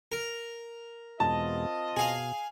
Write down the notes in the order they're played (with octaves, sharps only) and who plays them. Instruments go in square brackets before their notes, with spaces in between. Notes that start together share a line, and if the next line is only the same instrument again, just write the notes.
[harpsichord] A#4
[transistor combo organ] E2 B2 G#3 [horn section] C4 F4 D#5 [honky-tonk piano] A5
[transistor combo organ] B2 [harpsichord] G#4 F5